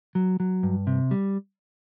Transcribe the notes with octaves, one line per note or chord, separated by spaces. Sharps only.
F#3
F#3
G2
C3
G3